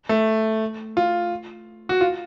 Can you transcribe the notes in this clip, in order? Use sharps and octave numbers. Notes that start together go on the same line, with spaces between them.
A3
F4
F#4
F4